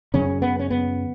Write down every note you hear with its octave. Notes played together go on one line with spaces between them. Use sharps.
F#2 C#3 C#4
B3
C#4
B3